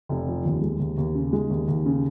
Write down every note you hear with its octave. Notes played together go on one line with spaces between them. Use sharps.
F1
F3
D#2
G#3
D#2
D#2
C#3
G#3
D#2
D#2
C#3